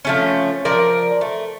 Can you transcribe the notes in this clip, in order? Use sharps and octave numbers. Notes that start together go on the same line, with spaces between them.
F3 A3 C#4
F3 A#4 D5
A3